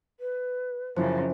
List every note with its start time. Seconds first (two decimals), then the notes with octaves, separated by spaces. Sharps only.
0.20 B4
0.97 F#2 C#3 F3 C#4 E4 C5